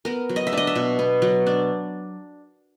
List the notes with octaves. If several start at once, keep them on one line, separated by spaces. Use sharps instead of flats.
B3 A#4
F#3
D#5
E5
D4 D#5
E5
B2
B3
F#3
D4